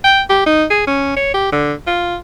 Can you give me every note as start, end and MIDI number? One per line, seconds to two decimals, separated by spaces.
0.04 0.21 79
0.30 0.44 67
0.47 0.64 63
0.70 0.83 68
0.87 1.12 61
1.17 1.33 73
1.34 1.49 67
1.52 1.73 50
1.87 2.16 65